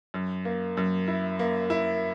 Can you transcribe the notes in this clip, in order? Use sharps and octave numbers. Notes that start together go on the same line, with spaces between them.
F#2
A#3
F#2
E4
A#3
E4